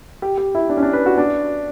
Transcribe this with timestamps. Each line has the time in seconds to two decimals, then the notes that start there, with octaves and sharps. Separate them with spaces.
0.22 G4
0.38 G4
0.55 E4
0.69 D4
0.77 C#4
0.82 D4
0.93 B4
1.06 F#4
1.18 D4